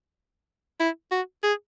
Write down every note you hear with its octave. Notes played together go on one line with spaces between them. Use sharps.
E4
F#4
G#4